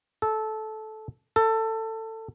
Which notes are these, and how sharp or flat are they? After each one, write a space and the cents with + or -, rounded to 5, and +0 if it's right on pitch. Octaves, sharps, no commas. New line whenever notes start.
A4 -15
A4 +20